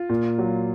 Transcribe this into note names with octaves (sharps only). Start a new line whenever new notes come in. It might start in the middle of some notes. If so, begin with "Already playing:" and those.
Already playing: F4
A#2
F#3